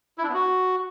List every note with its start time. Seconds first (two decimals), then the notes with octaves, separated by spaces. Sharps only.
0.18 E4
0.23 D4
0.29 B3
0.34 F#4